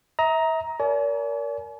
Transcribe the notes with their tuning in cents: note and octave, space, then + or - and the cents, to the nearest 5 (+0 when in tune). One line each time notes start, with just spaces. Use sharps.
E5 -30 A#5 +10 D#6 +35
A#4 +0 D5 -45 G#5 +40